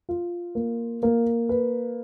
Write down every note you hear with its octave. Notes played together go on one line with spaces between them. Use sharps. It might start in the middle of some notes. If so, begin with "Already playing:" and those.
F4
A#3
A#3
B4